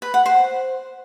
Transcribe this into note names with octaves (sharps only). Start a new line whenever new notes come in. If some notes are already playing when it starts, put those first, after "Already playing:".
B4
F#5
C5